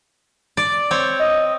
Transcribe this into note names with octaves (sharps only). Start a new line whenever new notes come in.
D5
C4 C#5
D#5